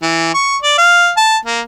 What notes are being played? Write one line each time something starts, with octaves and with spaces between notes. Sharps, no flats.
E3
C#6
D5
F5
A5
A#3